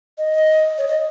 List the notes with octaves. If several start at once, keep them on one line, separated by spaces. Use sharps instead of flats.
D#5
C#5
D#5